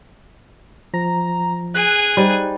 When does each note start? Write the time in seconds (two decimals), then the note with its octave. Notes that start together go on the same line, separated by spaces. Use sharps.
0.94 F3 A#5
1.75 G#4 G#5 F#6
2.17 G3 D#4 C5